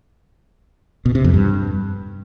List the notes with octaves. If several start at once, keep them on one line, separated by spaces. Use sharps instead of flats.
B2
C3
F2
G2